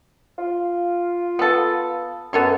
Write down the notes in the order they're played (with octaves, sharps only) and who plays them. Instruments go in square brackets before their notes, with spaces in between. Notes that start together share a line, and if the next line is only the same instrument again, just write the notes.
[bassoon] F4
[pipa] B3 A4
[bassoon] F#2 [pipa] B3 A4 C#5